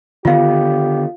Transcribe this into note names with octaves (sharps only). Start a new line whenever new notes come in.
D3 D#3 B3 F4 G4 F5